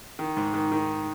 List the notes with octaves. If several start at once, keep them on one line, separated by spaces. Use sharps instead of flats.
D#3
G#2
D#3
D#3